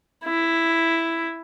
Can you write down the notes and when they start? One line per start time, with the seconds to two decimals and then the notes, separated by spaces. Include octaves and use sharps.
0.24 E4